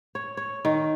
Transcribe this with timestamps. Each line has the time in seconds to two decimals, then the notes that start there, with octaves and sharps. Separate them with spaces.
0.15 C#5
0.37 C#5
0.65 D#3